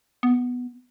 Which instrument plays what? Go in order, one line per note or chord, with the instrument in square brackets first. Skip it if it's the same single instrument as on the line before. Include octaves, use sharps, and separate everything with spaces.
[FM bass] B3